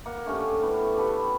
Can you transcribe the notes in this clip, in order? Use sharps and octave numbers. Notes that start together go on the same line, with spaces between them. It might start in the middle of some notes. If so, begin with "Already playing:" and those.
A#3 F#5
D3 A3 C#4 G4
A2 B3
G4 A4 B4